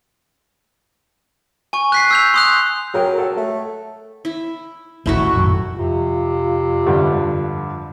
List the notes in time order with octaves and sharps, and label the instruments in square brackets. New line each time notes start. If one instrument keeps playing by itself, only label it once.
[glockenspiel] G#5 C#6
F#6 B6 C7
E6 G6 F7
C6 D#6 F#6
[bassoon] F#3 [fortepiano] G#4 A#4 G5
[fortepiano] A4 C#5 F#5
[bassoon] A3
[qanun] E4
[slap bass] D#1 A1 E3 [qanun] A3 E4 F#4
[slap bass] F#2 A2 D#3
[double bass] F2 [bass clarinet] C3 [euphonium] F4
[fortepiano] G2 D3